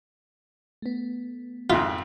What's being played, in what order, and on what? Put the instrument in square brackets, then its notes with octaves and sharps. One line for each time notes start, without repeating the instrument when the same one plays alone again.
[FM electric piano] A3 B3
[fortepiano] G#1 F2 E5 [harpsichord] F4